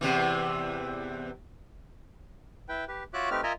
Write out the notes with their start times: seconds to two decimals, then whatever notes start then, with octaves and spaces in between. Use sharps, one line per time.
0.01 E2 C3 E3
2.69 E4 B4 G5
2.88 G4 B4
3.13 F4 F#4 C#5 E5 D6 F#6
3.31 A3 C4 D#4 G4 B4 F6
3.43 F4 A#4 D#5 E5 G#5 A#5